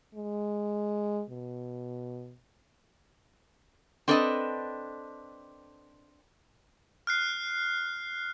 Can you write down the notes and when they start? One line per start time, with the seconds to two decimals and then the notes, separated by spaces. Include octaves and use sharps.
0.15 G#3
1.30 B2
4.08 C4 D4 A4 B4 D5 D#5
7.07 F6 F#6 C7